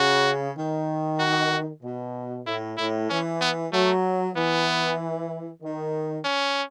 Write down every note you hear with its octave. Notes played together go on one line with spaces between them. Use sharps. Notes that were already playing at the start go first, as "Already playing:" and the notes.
Already playing: C#3 F#4
D#3
F#4
B2
A2 E4
A2 E4
E3 C#4
B3
F#3 A3
E3 B3
D#3
C#4